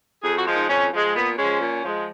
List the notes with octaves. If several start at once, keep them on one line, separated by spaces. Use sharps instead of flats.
F2 G#4
F#4
F3 G#3
D#4
F2 C#4
F3 G#3
A#2 B3
F3 G#3 C#4
A#2
F3 G#3